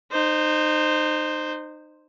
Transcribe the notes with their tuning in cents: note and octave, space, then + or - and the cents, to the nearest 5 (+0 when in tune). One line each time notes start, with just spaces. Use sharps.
D#4 -25 C5 +0